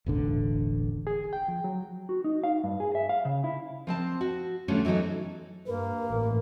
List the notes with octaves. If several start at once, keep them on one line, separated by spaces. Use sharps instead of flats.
E1 A1 D3
G#4
G5
F3
F#3
F#4
D#4
F5
G2
G#4
E5
F5
C#3
E4
F3 C4 A5
F#4
D3 E3 F3 G3 A3 C#4
E3 F#3 B3 D#4 A4
G2 A#3 A#4 B4
A1 A2